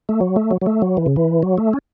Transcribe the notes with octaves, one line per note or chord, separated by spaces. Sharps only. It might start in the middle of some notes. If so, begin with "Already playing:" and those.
A3
F#3
A3
F#3
F#3
A3
F#3
E3
C#3
E3
F#3
A3
C#4